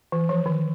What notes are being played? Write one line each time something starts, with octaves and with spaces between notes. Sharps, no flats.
E3
F3
D#3